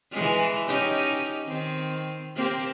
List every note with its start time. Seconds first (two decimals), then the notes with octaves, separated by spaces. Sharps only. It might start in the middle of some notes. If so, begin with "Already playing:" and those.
0.11 E3 G#3
0.66 C#4 D#4 G4
1.47 D#3 C4
2.35 A#3 C4 G4